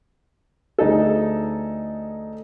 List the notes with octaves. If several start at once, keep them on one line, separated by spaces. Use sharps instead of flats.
D2 D#4 G#4 A4